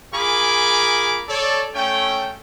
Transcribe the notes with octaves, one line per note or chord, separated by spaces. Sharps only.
F4 G#4 A#4 G#5 B5 D6
A4 C#5 D5
A3 C#4 G5